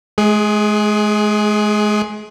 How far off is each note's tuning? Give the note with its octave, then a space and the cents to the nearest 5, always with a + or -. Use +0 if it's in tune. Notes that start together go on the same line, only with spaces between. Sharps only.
G#3 +35 G#4 +0